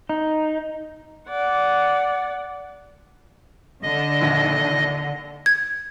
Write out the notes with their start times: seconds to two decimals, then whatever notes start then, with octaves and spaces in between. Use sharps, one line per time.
0.09 D#4
1.29 D5 F#5
3.83 D3 D#5
4.21 A#1 D#2 A#6
5.46 G#6